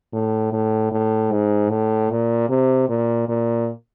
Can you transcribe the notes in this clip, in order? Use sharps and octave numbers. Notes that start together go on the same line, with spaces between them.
A2
A2
A2
G#2
A2
A#2
C3
A#2
A#2